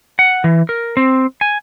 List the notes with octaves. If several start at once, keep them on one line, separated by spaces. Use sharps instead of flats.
F#5
E3
A#4
C4
G#5